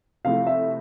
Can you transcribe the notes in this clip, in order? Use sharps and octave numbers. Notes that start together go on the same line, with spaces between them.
C3 F3 A3 E4 F5
E5